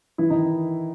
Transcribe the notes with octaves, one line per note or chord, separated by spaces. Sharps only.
E3 E4
D#3 D#4